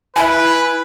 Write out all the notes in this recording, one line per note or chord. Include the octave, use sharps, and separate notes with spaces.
E4 B4 E5 G#5